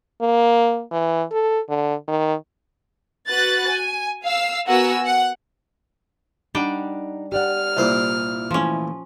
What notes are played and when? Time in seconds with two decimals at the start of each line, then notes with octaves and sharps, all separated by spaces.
0.21 A#3
0.91 E3
1.31 A4
1.69 D3
2.08 D#3
3.28 F#4 B4 F#6 A6
3.70 G#5
4.24 F5 E6 C7
4.68 B3 F#4 A#4 F#5 G#5 E6
5.05 F#5
6.55 G3 D4 D#4 F#5 G5
7.32 G4 D5 F#5 F6
7.77 C2 A#2 C5
8.51 E3 F3 A3 C#4